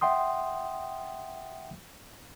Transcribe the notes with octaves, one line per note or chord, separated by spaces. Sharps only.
E5 F#5 G5 C6 D#6